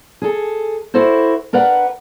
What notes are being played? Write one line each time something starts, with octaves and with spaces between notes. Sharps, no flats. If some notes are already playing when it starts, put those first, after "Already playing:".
G#4 A4
E4 F#4 A4 C5
D4 A#4 B4 F#5